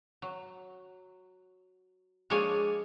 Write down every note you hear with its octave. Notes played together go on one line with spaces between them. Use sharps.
F#3
F3 G#3 A#3 D4 C#5 G#5